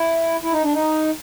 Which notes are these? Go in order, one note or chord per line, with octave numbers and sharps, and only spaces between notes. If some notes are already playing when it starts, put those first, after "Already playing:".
Already playing: E4
E4
D#4
D4
D#4